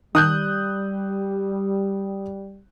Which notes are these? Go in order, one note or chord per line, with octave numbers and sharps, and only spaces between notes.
D#3 G3 D#6 F#6 G6